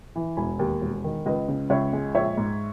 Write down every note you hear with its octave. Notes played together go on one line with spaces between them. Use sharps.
E3
E1 G#5 B5
D#2
E1
D#3
C#2 B4 D#5
C#3
C#2 C#5 E5
G#3
A#1 C#5 E5
G#2